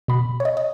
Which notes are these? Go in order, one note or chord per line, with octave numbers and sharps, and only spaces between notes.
B2 B5
C#5
D#5
D#5